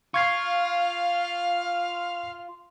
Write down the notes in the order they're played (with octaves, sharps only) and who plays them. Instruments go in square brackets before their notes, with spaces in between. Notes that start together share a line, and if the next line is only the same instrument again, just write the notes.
[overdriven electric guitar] F4 [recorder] F5 [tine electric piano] C#6 G#6 C7